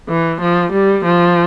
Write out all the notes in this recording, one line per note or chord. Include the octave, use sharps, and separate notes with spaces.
E3
F3
G3
F3